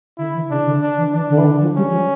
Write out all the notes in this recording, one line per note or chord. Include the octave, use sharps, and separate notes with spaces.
D3 E4
E3
C#3 D4
D3
D3 D4
E3
E3 D4
D3
E3
D3
F3
G3 C#4
F3